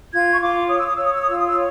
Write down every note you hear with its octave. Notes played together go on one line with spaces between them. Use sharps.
F4 G#6
C#6
F4 D6
C#5 D#6
E6
D#6
C#5 E6
D#6
E6
D#6
F4 E6
D#6
E6
C#5